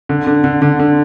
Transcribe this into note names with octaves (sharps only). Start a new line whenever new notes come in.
D3
D3
D3
D3
D3